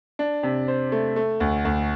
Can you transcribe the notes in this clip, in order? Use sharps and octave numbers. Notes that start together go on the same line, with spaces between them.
D4
C3
C5
A3
A3
D2
D2